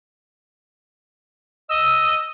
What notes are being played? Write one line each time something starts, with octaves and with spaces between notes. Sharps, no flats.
D#5 E6